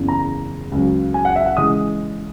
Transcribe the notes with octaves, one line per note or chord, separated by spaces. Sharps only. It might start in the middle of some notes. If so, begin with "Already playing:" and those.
Already playing: F#1 E2 C#3
A#5
C#2 C#3 F#3
G#5
F#5
E5
F#5
C#3 E3 G#3 D#6